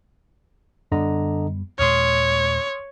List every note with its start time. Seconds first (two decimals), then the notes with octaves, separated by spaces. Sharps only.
0.92 F#2 D3 G3 B3 D#5 A#5
1.79 D#2 A#2 G#3 C#5 C6 D#6 F6